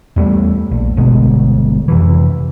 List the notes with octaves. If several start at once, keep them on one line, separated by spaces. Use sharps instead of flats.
E2 G3 A3
A#1
G1 D2 B2 G#3
F2 C3 E3